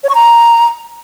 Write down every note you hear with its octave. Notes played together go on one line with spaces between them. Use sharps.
C#5
C#6
A#5